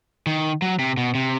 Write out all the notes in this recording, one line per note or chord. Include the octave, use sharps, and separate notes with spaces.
D#3
F#3
C3
B2
C3